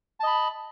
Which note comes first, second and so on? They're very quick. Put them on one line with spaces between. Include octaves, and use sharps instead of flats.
A5 D#5 B5